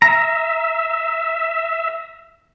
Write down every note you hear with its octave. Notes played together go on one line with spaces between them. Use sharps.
E5 A#5